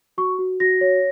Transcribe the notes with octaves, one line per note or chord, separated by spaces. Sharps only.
F#4 C#6
F#4
F#4 A#6
C#5